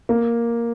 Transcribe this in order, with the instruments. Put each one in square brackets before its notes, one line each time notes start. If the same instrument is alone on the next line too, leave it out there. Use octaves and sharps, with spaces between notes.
[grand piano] A#3